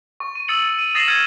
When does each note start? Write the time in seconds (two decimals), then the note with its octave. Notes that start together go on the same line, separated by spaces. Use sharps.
0.20 C#6
0.35 D#7
0.48 D#6 E6 A6 C#7 F#7
0.79 D#7
0.95 D#6 A6 A#6 C7 E7 F#7
1.08 F6 G#6 A6 C#7 D#7 E7